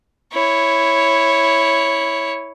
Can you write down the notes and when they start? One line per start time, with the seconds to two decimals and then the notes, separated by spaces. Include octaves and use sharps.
0.33 E4 C#5